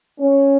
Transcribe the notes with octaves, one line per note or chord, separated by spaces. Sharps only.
C#4